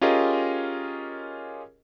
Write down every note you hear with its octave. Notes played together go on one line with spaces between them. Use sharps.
C#4 F4 G4 G#4 A#4 D#5